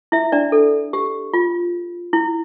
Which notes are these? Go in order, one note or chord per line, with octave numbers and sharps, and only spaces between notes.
E4 E5
D4 D5
A4
G4
F4
E4